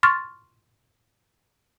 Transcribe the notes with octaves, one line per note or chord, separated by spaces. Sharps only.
C6 C#6 F6 A6